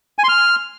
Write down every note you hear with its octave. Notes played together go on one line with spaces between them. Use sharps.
G#5
C6
F6